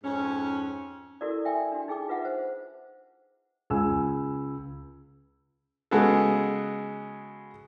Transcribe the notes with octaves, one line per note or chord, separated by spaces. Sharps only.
F2 G#2 C#4
E4 F#4 A4 A#4 D5
E5 G5 G#5 C6
D4 F#4
D#4 G#4 G5 D6
F4 B4 E5 F#5
C5
C#2 G#5 E6
C#3 G#3 B3 F#4 G#4 A4